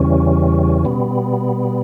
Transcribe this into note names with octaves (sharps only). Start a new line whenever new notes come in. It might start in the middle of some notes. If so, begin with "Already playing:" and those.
Already playing: E2 C#3 E3 G3 C#4
B2 G3 B3